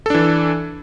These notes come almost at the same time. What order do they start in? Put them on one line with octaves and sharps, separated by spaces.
A4 D4 E3